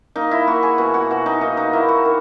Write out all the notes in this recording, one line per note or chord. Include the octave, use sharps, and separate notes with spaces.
A#3 D#4
E4
A#3 F#4
G#4
B2 F#4
F#4
B2 F#4
D#4
A#3 D#4
D#4
A#3 E4
F#4
D#3